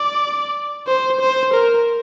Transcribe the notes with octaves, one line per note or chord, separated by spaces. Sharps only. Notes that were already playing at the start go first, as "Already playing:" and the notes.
Already playing: D5
C5
C5
A#4